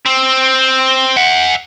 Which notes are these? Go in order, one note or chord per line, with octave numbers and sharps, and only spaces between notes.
C4
E5 F#5